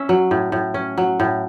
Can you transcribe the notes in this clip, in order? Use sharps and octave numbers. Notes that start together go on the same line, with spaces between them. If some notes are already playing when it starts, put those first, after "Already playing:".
Already playing: C#4 E5
F#3
A2
A2
C#4
F#3
A2